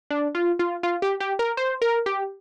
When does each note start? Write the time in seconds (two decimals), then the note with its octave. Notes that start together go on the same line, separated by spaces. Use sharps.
0.10 D4
0.35 F4
0.59 F4
0.83 F4
1.02 G4
1.20 G4
1.39 A#4
1.57 C5
1.82 A#4
2.06 G4